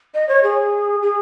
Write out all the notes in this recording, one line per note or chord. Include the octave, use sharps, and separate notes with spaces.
D#5
C#5
G#4
G#4